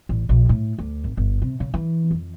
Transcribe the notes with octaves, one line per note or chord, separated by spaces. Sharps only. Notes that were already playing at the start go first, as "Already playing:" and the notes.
A1
A#1
A2
D2
G#1
G1
C3
C#3
E3
F2